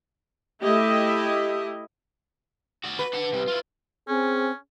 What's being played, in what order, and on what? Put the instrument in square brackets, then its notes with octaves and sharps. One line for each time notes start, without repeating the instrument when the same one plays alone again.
[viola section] A3 E4 G4 D#5
[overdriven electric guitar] F#4 D5
[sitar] B4
[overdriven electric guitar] D4 F#5
C3 G3
E4 F4
[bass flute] C4 [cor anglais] C#4 [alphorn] G#4